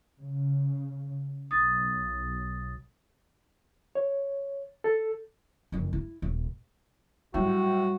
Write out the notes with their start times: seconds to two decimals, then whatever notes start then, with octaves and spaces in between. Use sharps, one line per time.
0.20 C#3
1.51 B1 D#6 A6
3.95 C#5
4.84 A4
5.72 F#1 F2
5.93 E4
6.22 D#1
7.34 A2 F#3 G3 F#4